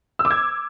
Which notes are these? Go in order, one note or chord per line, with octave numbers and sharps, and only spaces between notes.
E6
D6
G#6